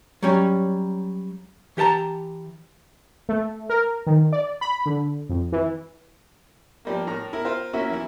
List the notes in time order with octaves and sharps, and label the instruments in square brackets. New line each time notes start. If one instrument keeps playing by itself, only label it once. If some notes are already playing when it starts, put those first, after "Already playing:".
[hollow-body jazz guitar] F#3 G3 C#4
E3 G4 A#4 A5 A#5
[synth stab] A3
A#4
D#3
D5
B5
D3
F2
E3
[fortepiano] F3 G3 A#3
A2 A#4 A#5
E4 A#4
F4 A#4 C5 F5
A#3 C#4 E4 F#4 E5
E3 E4